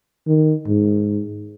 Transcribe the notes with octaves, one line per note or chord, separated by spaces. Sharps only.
D#3
G#2